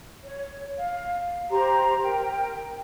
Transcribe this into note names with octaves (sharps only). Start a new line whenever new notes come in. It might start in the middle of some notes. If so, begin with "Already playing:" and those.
C#5
F5
G4 C5 A#5 C6
A#4 G5